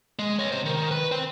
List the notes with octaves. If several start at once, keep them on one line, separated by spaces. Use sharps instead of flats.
G#3
C#5 D#5
C3 C5
D#3
B4
C5 G5